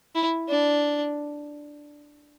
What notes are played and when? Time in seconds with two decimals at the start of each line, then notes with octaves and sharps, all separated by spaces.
0.15 E4
0.49 D4